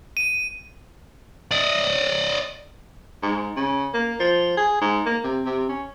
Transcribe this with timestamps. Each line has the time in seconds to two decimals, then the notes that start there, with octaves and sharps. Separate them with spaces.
0.17 D#7
1.51 D5 D#5
3.23 G#2
3.57 C#3
3.94 A#3
4.20 F3
4.57 G#4
4.81 G#2
5.06 A#3
5.24 C3
5.45 C3
5.69 C#4